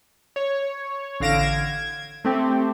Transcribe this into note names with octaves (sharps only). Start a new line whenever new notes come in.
C#5
A1 D3 F5 A#6 D7 E7
G#6
A3 C4 G4